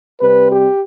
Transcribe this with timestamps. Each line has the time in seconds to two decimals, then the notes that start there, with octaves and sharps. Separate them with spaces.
0.21 C3 G3 C4 B4
0.50 G4